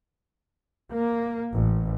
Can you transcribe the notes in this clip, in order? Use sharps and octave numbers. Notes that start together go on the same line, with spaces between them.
A#3
A1